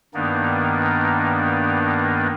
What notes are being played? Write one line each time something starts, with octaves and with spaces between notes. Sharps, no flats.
G2 D#3 A#3 B3 D4 D#4